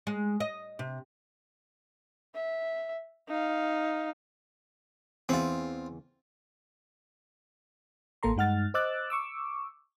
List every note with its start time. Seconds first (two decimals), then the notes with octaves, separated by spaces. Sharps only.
0.07 G#3
0.40 D#5
0.79 C3
2.34 E5
3.29 D#4 F5
5.29 E2 E3 C4 F4 G#4
8.23 A1 A#3 A4 A#5 C6
8.36 G2 G#3 D#4 F#5 F6 A6
8.74 C5 D#5 D6 E6 F#6 A6
9.10 C#6 D6 E6